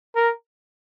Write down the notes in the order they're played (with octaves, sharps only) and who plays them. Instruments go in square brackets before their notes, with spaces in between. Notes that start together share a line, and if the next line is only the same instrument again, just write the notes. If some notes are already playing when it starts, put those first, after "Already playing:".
[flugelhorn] A#4